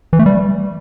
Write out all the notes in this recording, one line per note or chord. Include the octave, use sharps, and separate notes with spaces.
E3
A3
G3